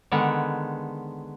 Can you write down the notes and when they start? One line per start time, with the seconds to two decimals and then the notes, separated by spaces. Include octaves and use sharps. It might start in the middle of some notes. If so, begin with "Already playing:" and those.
0.12 D3 D#3 G#3 B3